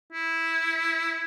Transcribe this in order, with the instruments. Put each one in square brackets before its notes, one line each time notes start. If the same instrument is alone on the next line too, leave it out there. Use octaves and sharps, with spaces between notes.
[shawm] E4